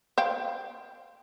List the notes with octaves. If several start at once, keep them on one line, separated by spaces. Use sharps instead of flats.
C5 F5 G5